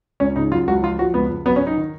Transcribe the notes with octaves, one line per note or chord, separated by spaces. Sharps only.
C#2 C#4
C#3 D#4
F#3 F4
C#2 F#4
F3 F4
F3 F#4
C#2 B3
C#2
F#3 B3
C#4
F#3
D#4
D#3